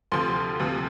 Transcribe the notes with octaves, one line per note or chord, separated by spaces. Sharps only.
D2 C3 F3 C6
D2 C3 F3